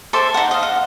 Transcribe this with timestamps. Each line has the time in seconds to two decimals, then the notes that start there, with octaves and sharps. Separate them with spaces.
0.13 A4 C5 E5 D6
0.34 D#4 F#5
0.51 D#5 F5
0.63 F#5